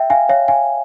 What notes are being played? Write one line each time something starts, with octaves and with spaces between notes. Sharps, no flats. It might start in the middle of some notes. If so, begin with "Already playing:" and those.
Already playing: E5 G5
F5 G#5
C#5 F5
F5 G#5